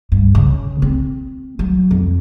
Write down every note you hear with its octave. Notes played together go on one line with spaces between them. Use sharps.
G2
C#3
C4
F#3
F2